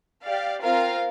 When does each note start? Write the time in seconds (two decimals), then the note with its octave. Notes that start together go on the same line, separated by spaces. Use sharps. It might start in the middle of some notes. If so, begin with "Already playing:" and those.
0.23 G4 D5 F5
0.62 C4 F4 A#4 F5